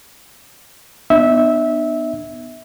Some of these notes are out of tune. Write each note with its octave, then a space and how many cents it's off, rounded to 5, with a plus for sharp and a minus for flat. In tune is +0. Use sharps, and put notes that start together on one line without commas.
B3 +0 D4 +45 E5 -15